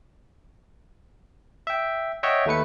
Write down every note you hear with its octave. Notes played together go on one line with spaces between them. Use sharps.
E5 G5
C#5 D#5 E5 F#5 G5
D#2 A3 B4 C#7